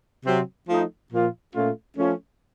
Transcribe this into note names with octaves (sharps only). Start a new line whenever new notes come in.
C3 F#3 C4
F3 A3 D#4
A#2 F3 A#3 F4
A#2 A3 C#4 F4
F3 A3 C#4